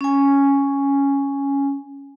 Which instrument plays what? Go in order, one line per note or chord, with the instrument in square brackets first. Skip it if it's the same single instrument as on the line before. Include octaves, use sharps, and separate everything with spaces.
[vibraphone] C#4 G#5